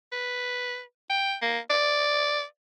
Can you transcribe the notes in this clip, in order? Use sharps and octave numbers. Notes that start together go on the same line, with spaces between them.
B4
G5
A#3
D5